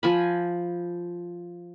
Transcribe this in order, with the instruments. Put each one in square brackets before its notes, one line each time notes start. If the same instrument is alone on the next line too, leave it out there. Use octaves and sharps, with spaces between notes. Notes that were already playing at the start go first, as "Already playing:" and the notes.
[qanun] F3 G#5 B5